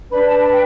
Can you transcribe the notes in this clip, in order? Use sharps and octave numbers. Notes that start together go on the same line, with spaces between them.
D4 B4 B5
A5
B5
G5